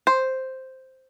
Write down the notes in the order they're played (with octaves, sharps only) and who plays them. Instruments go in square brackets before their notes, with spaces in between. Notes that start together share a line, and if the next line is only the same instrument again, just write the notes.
[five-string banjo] C5